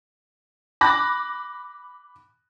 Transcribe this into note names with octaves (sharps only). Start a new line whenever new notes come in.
B5 D6 F#6 A#6